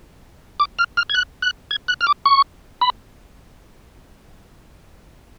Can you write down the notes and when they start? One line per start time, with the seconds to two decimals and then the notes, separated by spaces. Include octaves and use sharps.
0.60 D6
0.79 F6
0.97 F6
1.10 G#6
1.15 F#6
1.42 F#6
1.71 G#6
1.88 F#6
2.01 F6
2.07 D6
2.26 C#6
2.81 B5